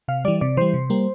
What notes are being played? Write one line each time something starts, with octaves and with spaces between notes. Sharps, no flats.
C3 F5
E3 G3 D5
C3 D5
E3 G3 C5
C3
G3 A#3